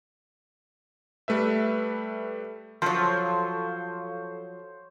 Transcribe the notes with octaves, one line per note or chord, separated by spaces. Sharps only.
G3 A3 B4 E5
F3 F#3 A4 C5 C#5 F5 C6